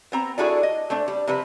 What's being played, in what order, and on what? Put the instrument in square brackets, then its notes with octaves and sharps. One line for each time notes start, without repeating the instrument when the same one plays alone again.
[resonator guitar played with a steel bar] B3 C4 A#5
D4 E4 F#4 G#4 A4 D5
D#5
A3 C4 D4
G3
C3 F3 G3 B4